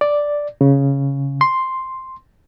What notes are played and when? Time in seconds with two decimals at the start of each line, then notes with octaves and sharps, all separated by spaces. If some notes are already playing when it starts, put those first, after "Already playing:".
0.01 D5
0.61 C#3
1.41 C6